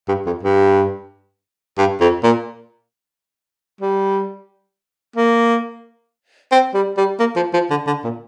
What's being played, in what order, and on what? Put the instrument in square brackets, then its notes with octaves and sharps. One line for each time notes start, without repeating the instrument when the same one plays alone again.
[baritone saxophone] G2
F2
G2
G2
F2
A#2
G3
A#3
C4
G3
G3
A#3
F3
F3
D3
D3
A#2